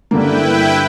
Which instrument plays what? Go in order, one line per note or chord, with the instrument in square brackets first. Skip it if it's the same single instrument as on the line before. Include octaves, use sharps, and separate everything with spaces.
[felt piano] G2 D3 A#3 [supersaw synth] E4 B4 G5